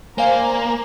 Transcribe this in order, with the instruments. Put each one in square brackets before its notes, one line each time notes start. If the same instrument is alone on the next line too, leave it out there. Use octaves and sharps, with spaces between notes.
[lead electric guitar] A#3 [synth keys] C5 D5 F5 [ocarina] G#5 [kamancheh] A#5